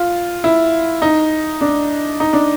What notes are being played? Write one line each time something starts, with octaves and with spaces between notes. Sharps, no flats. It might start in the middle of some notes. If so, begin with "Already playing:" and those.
Already playing: F4
E4
D#4
D4
D#4
D4